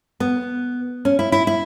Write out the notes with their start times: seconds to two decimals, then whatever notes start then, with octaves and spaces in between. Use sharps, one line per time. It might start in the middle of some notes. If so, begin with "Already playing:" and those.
0.20 B3
1.05 C#4
1.19 E4
1.32 E4
1.47 E4